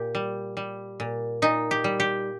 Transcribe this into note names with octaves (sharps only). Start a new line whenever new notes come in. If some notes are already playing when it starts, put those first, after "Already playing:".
Already playing: A#2 G4
G3
G3
A#2
A#2 D#4
G4
G3
G4